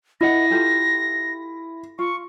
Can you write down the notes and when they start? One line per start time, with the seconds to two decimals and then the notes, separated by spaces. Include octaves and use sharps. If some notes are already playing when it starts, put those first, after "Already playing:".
0.21 E4 A#4 D#5 F#5 A#6
0.50 F4 G4 A4
1.99 F4 C#6